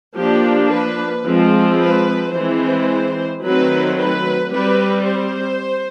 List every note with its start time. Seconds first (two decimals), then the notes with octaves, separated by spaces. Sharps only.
0.18 F3 A#3 D4 G4
0.72 B4
1.26 F3 G#3 C4
1.80 B4
2.35 E3 G#3 C4 C5
3.43 D#3 F#3 A3 C4 B4
3.98 B4
4.53 G3 C4 B4
5.08 C5